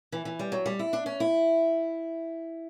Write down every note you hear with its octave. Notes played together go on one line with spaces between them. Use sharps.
E3
E3
G3
F#3
G3
E4
D4
C#4
E4